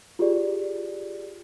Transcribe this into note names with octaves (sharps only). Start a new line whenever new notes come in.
F4 G4 G#4 D5